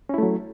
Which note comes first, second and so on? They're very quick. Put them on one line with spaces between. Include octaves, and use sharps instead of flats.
C#4 E4 A3 F#3